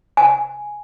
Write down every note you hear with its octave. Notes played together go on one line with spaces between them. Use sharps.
G#5